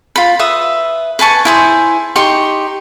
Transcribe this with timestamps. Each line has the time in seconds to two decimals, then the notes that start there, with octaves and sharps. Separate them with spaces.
0.16 F4 B5
0.39 B4 E5 D#6
1.19 B4 G#5 A5 C#6
1.45 E4 G#4 C5
2.16 D#4 G4 C6 C#6